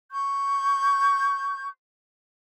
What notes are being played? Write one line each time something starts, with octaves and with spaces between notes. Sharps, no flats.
C#6 G6